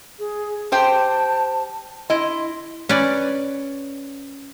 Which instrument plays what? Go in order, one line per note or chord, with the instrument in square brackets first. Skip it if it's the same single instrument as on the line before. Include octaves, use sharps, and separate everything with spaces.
[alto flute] G#4
[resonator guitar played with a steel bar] G4 C5 G5 [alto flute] A5
[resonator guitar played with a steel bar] E4 D#5 [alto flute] C6
[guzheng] C#4 B4 D5